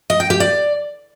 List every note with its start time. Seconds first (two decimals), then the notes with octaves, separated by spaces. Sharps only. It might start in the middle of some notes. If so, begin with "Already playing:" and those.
0.10 D#5
0.20 G5
0.30 G4
0.40 D5